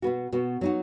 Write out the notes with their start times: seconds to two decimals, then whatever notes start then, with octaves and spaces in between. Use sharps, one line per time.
0.02 B2 B3 F#4
0.32 B2 B3 F#4
0.61 F#3 D#4 F#4